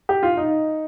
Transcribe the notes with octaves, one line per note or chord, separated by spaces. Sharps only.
G4
F4
D#4